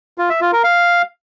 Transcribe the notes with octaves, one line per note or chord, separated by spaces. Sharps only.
F4
E5
F4
A#4
F5